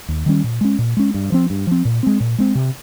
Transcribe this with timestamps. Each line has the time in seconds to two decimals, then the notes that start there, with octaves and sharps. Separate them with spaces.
0.08 D#2
0.26 D#3 G3 C#4
0.44 A#2
0.61 G#3 C#4
0.79 A#2
0.97 G#3 C#4
1.14 G2
1.32 F3 C4
1.50 G2
1.67 F3 C4
1.85 A#2
2.03 G#3 C4
2.20 A#2
2.38 G#3 C4
2.55 C3